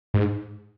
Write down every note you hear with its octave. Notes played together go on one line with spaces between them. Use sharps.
G#2